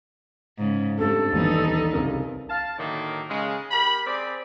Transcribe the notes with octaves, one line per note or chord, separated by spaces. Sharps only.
G#2 C#3
G2 G3 A3 C4 A4
A#1 D#2 E3 G3 B3 D#4
C2 C#3 A#4
F5 A5
A2 D3 D#3 F#3 A#3
C#3 G#3
G4 A#4 B5
C4 G#4 D5